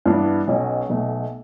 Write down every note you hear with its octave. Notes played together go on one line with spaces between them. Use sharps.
G2 E3 B3 D4
B1 B2 F#3 C#4
B1 B2 A3